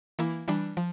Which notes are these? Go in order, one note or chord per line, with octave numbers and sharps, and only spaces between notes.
E3 A#3 E4
E3 G3 D4
F3